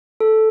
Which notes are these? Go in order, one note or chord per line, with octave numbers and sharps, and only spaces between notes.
A4